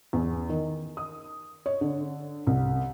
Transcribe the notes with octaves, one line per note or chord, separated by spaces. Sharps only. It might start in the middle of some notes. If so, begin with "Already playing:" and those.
E2
D#3
D#6
C#5
D3
C2